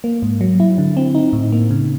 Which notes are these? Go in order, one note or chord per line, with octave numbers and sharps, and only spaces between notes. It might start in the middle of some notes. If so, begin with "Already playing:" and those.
A#3
G#2
F#3
E4
D3
C4
D#4
A2
A#3
C#3